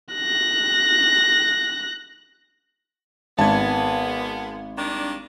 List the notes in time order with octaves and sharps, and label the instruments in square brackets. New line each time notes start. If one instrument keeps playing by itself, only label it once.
[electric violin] F#6 A#6
[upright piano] G#1 [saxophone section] G#3 A#3 B3 [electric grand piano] A5 G#6
[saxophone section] D#3 G3 D4